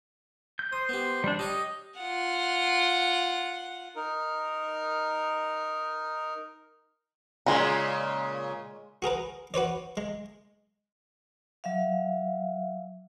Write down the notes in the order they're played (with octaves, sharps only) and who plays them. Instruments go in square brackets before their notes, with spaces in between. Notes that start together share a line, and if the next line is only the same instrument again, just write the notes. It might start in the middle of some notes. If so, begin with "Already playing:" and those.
[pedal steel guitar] G6
[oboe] C5 [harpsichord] D#6
[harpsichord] B3 G4
[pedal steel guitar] G3 D4
[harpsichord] G4 C#5 F5 [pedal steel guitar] D#5
[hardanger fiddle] F4 F#5
[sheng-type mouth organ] D#4 A#4
[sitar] A#2 C#3 [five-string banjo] G#3 D#4
[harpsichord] F#4 G#4 A#4 B4
F#4 B4 C#5 D5
G#3
[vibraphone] F#3 E5 F5